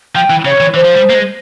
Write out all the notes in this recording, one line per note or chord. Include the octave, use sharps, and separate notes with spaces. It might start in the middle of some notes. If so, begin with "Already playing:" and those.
F3 G5
E3
C#3 C#5
E3
E3 C5
F3
G3
A#3
G#3